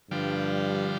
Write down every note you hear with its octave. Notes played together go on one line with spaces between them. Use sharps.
G2 D3 F3 G3